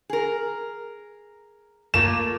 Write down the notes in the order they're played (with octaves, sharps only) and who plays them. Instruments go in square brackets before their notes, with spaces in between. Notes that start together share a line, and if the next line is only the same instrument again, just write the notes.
[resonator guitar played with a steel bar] G#4 A#4
[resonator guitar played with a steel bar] A3 A#3 F4 [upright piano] E7